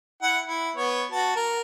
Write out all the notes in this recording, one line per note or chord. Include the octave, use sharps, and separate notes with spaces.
E4 F#5
E4
B3 C#5
F#4 A5
A#4